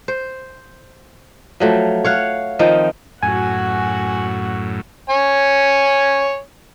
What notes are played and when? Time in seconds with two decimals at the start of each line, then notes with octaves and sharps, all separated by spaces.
0.08 C5
1.60 F3 F#3 A3
2.04 C#5 F5 F#5
2.59 D#3 F3 C4 D#4
3.23 F#2 A2 F#4 F#5 G#5
5.10 C#5 G#5